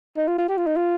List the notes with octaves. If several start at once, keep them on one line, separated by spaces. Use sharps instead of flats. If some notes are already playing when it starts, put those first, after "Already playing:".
D#4
F4
F4
G4
F4
D#4
F4